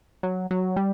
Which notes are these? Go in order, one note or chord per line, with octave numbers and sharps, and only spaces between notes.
F#3
F#3
G3